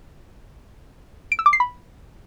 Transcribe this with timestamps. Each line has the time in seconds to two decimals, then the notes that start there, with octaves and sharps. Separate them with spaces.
1.32 D7
1.39 E6
1.46 D6
1.53 C7
1.60 B5